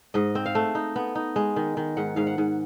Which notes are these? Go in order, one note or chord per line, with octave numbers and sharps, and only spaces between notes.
G#2 D#5
C4
F5
A3
D#4
B3
D#4
G#3
D#3
D#3
G#2 F#5
G#2 F5
F#5
G#2